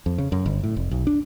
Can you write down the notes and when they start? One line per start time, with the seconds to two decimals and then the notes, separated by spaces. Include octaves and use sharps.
0.06 F2
0.18 C#3
0.32 F#2
0.46 G1
0.63 A2
0.76 F1
0.91 B1
1.07 D4